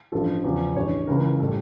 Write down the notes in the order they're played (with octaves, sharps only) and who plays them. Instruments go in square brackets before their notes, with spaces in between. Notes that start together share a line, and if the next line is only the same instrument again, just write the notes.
[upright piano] A1 G2 F3 A4
E2 C#3 F3
A1 G2 E3 C#5
C#2 C#3 E3 A#4
A2 G3 A4